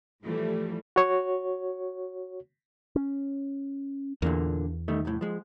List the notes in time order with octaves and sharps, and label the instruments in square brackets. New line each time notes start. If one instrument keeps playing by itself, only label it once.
[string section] A2 E3 F3 G3 A3
[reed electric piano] F#4 C#5
[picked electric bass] C#4
[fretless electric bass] E2 [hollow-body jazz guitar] A#2 D3 A#3
[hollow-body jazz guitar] D#3 G3 A3
C2 F2 A2
F3 G#3